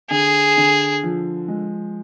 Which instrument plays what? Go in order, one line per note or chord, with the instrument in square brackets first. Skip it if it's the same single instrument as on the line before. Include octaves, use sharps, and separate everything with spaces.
[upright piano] D3 [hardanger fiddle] G#4
[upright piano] D3
F3
G#3